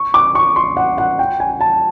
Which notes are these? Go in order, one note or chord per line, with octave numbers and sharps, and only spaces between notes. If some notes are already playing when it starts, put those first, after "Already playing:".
Already playing: C#6
D6
C#6
C6
F#5
F#5
G5
G#5
A5